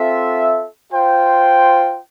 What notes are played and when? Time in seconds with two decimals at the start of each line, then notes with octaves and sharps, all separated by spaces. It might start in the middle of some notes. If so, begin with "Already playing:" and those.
Already playing: C4 F4 A4 E5
0.92 F4 C5 G5